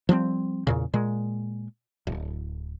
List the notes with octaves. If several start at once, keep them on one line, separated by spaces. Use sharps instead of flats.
F3 G3 B3 C4
E2 A#2 C#3
A#2 G#3
D1